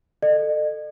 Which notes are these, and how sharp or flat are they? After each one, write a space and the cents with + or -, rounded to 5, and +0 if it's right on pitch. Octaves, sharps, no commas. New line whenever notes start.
A4 +15 D#5 -40